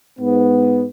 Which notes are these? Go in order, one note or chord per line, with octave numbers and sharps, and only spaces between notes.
G#2 B3